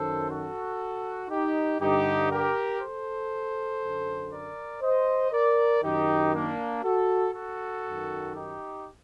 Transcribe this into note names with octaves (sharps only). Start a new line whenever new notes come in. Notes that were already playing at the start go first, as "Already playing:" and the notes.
Already playing: F#2 D#3 A4 C5
F#4 A4
D#4 G4
G2 D3 D#4 G4
G4 A#4
A4 C5
F#2 D3
A#4 D5
C5 D#5
A#4 D5
F#2 D#3 D#4 G4
A#3 D4
F#4 A4
F#4 A4
F#2 D#3
D#4 G4